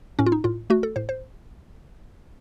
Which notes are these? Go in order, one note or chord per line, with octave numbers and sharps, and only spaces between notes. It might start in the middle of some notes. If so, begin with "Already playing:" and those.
A2 C#4
F4
D#4
A2 F4
A3 F#4
A4
A2 C5
C5